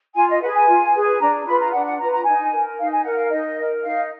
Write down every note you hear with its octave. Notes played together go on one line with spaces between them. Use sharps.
F4 G#5
D#5
G#4 B4 F#5
G#5
F4
G#4 B4
D4 A#5
F4 B4 B5
A#5
D4 F#5
F#5
F4 B4 A#5
A#5
D#4 G#5
A#4
D#4 F5
G#5
A#4 F#5
F5
D#4 D#5
A#4
D#4 F5